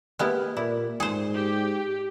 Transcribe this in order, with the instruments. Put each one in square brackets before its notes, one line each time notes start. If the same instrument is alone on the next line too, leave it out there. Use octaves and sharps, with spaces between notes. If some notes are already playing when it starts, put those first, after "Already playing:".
[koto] G#3 B3 E4 [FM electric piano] A#3 G4 F6
[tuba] A#2 [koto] E4 [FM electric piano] D5
[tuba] G#2 [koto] G#4 C5
[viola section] G4